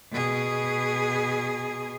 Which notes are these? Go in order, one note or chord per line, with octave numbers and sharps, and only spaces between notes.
B2 G#4